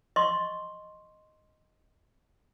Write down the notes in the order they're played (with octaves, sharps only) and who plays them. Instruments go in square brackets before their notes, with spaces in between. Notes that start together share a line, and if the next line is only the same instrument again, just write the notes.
[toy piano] D#5 C6 C#6